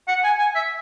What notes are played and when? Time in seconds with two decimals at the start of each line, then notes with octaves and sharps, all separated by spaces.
0.08 F#5
0.24 G#5
0.39 G#5
0.55 E5